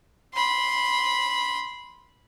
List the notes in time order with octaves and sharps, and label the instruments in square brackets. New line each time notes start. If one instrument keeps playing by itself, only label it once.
[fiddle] B5 C6